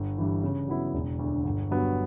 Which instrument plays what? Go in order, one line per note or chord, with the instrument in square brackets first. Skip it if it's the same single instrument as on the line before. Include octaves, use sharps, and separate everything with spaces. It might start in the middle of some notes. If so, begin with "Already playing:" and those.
Already playing: [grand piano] G1
G2 E3
C#3
F#3 B3 E4
E1
D2 D3
G1
G2 F#3 B3